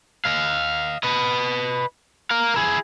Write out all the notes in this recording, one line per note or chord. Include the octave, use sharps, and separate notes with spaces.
D#5 F5
B4 D#5
A#4 F5
E4 G#4